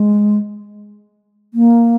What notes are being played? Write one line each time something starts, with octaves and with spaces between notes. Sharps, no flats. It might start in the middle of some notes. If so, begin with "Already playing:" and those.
Already playing: G#3
A#3